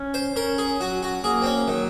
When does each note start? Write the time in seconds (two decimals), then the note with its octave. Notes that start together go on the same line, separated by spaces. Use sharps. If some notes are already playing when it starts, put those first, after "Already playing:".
Already playing: C#4
0.14 C5
0.36 C#4 A#4
0.58 G#4
0.80 F#3 F#4
1.03 F#4
1.24 A#3 G#4
1.42 C4
1.46 C#4
1.68 D#3 F#3